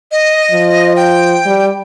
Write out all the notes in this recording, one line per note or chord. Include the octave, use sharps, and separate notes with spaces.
D#5
F3
G5
G3